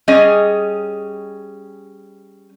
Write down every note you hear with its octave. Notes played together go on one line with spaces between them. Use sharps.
G3 C#4 G#4 D#5